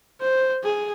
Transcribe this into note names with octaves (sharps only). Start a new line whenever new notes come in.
C5
G#4